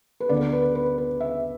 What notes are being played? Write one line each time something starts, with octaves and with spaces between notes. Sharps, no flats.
B4
D2 D3 B3 D4 D5
B4
B4
B4
E5